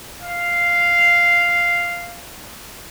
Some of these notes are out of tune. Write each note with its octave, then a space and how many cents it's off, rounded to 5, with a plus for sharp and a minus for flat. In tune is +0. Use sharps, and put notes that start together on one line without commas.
F5 -5